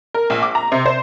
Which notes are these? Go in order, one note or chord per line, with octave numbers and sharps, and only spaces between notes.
A#4
A#1
D6
A#5
C3
C5